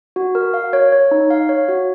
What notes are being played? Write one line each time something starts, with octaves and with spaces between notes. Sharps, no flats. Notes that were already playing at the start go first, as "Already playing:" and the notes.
F#4
A#4
F5
C#5
C#5
D#4
F5
C#5
F#4